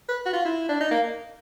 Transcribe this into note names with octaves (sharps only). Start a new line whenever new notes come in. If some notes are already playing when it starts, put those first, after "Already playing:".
B4
F#4
F4
E4
D4
D#4
A#3